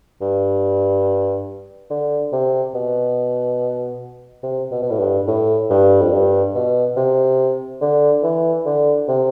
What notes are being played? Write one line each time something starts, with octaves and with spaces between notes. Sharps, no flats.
G2
D3
C3
B2
C3
B2
B2
A2
G2
A2
G2
F2
G2
B2
C3
D3
E3
D3
C3